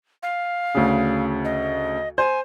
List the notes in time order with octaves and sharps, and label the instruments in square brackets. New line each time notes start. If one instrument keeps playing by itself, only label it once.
[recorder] F5
[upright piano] D2 C#3
[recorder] D#5
[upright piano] C5 [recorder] G#5